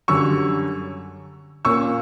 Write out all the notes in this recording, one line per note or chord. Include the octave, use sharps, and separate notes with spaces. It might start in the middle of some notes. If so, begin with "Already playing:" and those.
F#2 D3 G3 C#4 C#6 E6
A#2 A#3 C#4 C#6 E6